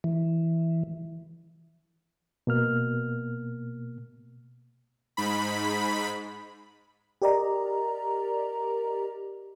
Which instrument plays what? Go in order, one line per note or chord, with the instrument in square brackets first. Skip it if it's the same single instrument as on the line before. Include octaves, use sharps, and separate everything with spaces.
[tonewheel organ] E3
[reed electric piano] B2 A#3 F6
[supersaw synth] G#2 B5
[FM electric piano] G4 A#4 D5 D#5 A#5